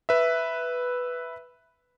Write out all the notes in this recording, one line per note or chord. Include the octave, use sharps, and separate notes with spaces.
B4 E5